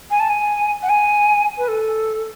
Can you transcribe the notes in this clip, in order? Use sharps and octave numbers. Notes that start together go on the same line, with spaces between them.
G#5
A5
G#5
F#5
G#5
B4
A4